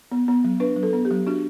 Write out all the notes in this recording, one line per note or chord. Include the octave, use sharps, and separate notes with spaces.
B3
B3
F#3
D4 B4
F#3
A4
B3
G4
F#3
D4 F#4